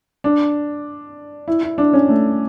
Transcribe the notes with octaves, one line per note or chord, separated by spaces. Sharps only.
D4
E4
E4
D4
C#4
A3